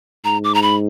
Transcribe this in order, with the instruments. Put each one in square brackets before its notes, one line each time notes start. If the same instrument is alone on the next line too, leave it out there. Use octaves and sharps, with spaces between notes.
[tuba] G#2 [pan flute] A#5
[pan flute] D6
A#5
B5